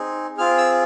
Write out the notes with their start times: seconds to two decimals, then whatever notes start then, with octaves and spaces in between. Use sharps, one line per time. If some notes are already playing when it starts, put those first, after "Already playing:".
Already playing: C4 D#4 G#4
0.38 C4 F4 G#4 F6
0.58 E6